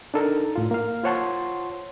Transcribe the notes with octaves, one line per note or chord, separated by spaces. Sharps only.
D4 D#4 A4 A#4
A2 F4
A#3 F5
F4 C5 C#5 F#5 A5 C6